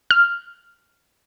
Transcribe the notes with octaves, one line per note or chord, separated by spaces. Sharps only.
F6